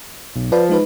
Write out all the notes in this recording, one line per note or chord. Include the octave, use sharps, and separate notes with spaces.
B1
F3 B4 D5
G#3 D#4 B4